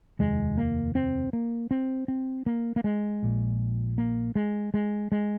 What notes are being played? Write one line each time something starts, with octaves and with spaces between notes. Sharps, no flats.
F1 D#2 G#3
A#3
C4
A#3
C4
C4
A#3
A#3
G#3
A#1 A#2
A#3
G#3
G#3
G#3